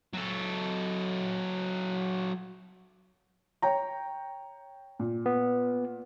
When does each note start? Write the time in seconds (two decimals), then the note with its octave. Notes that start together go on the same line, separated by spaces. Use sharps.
0.14 F#3 A4
3.62 C#5 G5 A#5
4.99 A#2
5.26 B3